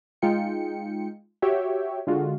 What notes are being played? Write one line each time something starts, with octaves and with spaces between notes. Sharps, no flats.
G#3 D#4 F4 G5 C#7
F#4 G4 C#5 E5 G5
D3 G#3 F4 F#4